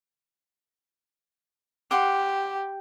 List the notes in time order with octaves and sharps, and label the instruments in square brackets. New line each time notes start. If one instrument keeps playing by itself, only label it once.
[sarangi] G4 [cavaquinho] F#5 C6 D6